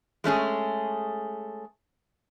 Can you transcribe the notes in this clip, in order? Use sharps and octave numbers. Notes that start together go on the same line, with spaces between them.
G#3 A3 C#4 G#4